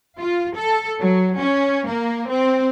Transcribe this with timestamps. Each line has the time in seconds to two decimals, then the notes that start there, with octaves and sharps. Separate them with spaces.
0.18 F4
0.55 A4
1.01 F#3
1.38 C#4
1.87 A#3
2.30 C4